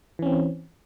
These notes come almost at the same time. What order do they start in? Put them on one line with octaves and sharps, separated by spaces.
E3 C#4 C4